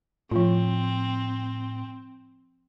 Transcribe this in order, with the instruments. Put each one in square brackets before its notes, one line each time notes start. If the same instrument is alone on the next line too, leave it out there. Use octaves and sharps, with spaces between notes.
[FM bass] A2 [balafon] F3 F4 [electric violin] C4